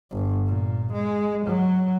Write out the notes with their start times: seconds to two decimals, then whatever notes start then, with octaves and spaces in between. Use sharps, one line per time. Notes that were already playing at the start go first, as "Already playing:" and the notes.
0.12 G1
0.46 A#2
0.93 G#3
1.46 F#3